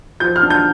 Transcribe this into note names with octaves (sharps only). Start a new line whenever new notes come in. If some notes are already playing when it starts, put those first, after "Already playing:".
F3 G6
F6
D4
G6